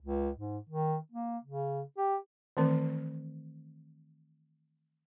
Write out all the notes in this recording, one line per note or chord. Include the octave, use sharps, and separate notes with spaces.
C#2
G#2
D#3
A#3
C#3
G4
D#3 E3 A3 C4 A#4